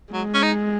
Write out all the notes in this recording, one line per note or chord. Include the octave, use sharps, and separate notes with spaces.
F#3 G#3
C#4
D#4